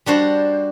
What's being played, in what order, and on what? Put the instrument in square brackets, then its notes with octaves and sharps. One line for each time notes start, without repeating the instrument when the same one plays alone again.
[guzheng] G3 D4 F#4 C5